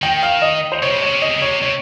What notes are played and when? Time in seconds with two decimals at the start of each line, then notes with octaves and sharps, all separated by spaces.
0.02 D#3 G5
0.23 F5
0.42 D#5
0.72 C5
0.82 C3 C#5
0.90 C#3
0.98 C3
1.02 C#3 C#5
1.13 C3
1.22 C#3 D#5
1.29 C3
1.37 C#3
1.42 C3 C#5
1.61 C3 C#5